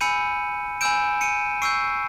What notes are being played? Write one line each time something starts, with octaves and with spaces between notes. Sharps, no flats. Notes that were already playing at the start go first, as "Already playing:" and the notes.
G#5 B5 E6 G6 C#7 D#7
G#5 B5 E6 G6 D7 E7
C#7 D#7
C#6 E6 G6 C7 D7